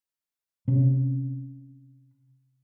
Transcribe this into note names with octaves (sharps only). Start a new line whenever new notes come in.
C3 C#4